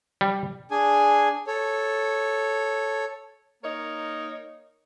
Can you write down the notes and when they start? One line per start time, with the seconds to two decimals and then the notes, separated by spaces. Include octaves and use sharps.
0.21 G3
0.71 D4 G#4 G#5
1.47 A4 C#5
3.63 A#3 D#4 A#4 C#5